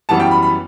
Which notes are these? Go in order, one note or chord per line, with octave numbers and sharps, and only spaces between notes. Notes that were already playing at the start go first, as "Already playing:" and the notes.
F#2 E3 G3 B3 A5
G5
B5
B5